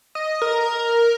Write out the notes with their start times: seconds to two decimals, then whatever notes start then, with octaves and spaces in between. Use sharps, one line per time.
0.15 D#5
0.42 A#4